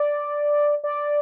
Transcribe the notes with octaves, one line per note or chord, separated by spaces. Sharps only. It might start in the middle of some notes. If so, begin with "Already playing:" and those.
Already playing: D5
D5